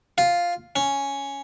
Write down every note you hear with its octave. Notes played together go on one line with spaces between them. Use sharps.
F4
C#4